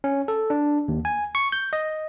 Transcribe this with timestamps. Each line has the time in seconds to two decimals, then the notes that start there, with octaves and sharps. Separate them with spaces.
0.04 C#4
0.28 A4
0.50 D4
0.88 D#2
1.05 G#5
1.35 C#6
1.52 G6
1.73 D#5